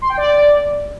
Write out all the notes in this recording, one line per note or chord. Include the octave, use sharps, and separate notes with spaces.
C6
G5
D5